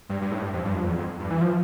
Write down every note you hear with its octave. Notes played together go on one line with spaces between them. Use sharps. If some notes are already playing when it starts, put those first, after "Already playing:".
G2
G2
A2
G2
F2
G2
F2
E2
F2
G2
E3
F3